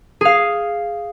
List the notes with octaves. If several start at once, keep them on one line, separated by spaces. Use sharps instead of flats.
G#4 F5